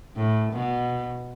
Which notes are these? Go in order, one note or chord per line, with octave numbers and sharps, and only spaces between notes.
A2
B2